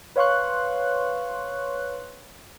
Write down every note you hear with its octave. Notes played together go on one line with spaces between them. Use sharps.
B4 C#5 F5 C6 C#6 F#6